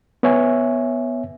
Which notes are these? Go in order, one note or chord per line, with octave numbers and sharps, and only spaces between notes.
B3 C#5 E5 G#5